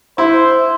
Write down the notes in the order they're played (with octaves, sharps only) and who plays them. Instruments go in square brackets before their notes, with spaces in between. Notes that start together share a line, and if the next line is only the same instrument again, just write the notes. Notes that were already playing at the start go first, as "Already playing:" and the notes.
[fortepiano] E4 [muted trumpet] C5